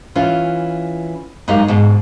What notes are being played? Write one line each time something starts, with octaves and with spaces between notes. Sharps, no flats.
E3 C#4 F4
F#2 G#3 D#4 G4 F5
G#2 B2